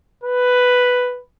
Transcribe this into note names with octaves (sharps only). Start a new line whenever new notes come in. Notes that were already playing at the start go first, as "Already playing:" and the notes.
B4